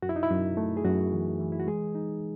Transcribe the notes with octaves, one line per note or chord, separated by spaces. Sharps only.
F#2 F#4
E4
D#4
E4
F#2
A3
G#4
F#2 F#4
E3
E3
E4
F#4
G#3 G#4
D#4